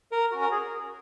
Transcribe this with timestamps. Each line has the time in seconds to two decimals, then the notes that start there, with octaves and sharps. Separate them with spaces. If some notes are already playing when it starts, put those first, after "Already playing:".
0.12 A#4
0.32 C#4 F#4
0.41 A#4
0.51 G#4